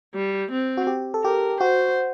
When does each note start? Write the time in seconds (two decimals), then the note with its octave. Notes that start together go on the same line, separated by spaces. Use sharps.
0.14 G3
0.51 C4
0.77 F#4
0.87 G4
1.14 A4
1.23 G4 A#4
1.60 F#4 C5